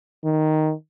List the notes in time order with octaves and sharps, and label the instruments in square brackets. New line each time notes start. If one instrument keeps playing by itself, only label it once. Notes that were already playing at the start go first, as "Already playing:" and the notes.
[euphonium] D#3